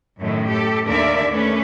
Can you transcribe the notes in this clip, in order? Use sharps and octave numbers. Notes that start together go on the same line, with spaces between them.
F#2 A2 D#3 A3
G4 A4
D#2 D3 A#4 D5 E5
A3 C#4 B4